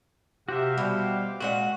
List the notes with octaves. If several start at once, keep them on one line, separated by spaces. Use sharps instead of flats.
C3 F#4 G4 C5 E5 F5
B2 G3
A#2 G#3 F4 F#4 F#5